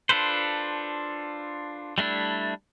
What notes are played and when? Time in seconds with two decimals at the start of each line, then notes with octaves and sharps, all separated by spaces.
0.09 D4 F4 A4 B4 C5
1.98 G3 A3 D4 E4